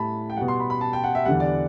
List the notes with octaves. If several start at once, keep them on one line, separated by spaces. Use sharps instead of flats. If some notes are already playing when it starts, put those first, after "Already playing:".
Already playing: A2 G3 A5 B5
G5
B2 G3 F#5
C6
B5
B5
A5
G5
F#5
E5
E2 D3 G3 F#5
D5